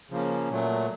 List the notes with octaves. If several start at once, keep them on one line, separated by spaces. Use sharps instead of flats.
C#3 F3 A#3 C#4
A#2 F#3 A3